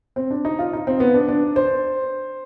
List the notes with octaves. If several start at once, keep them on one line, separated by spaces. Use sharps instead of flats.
C4
D4
D#4
F4
D#4
C4
B3
D4
D4
C5